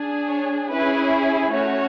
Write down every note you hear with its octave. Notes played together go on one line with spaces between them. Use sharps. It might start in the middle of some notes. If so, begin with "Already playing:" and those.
Already playing: D4 G#4
C#5
C#4 E4 G#4 B4
A3 C#4 F#4 C#5